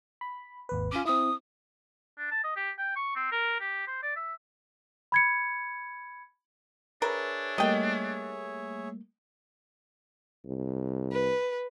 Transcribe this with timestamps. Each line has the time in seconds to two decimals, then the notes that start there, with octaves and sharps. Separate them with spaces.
0.21 B5
0.69 G#1 D#2 B4
0.91 C#4 F4 D6
1.05 C4 E4 D#6
2.18 D4
2.31 A5
2.44 D#5
2.56 G4
2.78 G5
2.96 C#6
3.16 C4
3.32 A#4
3.60 G4
3.87 C5
4.03 D5
4.16 E5
5.12 B5 G#6 C#7
7.02 D4 G#4 A#4 B4 C#5 E5
7.58 G3 A3 A#3 D#5 G5
10.45 C2
11.13 B4